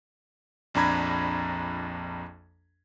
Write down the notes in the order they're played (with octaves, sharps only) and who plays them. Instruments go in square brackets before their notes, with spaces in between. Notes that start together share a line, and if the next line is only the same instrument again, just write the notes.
[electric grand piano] A#1 F2 D4 A#5 B5 G#6